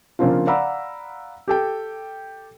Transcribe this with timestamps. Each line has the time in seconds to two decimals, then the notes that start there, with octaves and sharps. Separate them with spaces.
0.19 C#3 F3 A#3 C4 D4 F4
0.47 D5 F5 F#5 A#5 B5 E6
1.48 G4 A4 G5